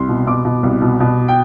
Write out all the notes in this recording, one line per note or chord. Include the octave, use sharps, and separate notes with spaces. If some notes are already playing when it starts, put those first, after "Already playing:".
Already playing: C2 C6
B2
B2 D6
B2
C2
B2
B2
G5